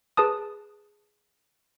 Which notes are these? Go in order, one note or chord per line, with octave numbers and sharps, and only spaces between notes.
G#4 B4 A5 D#6